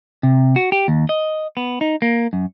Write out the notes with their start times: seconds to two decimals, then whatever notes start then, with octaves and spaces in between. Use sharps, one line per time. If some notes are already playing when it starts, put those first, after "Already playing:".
0.23 C3
0.56 F#4
0.72 G4
0.88 D#2
1.09 D#5
1.57 B3
1.81 D#4
2.02 A#3
2.33 F#2